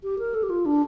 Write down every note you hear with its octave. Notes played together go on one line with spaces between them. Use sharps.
G4
A#4
A4
G4
F4
D4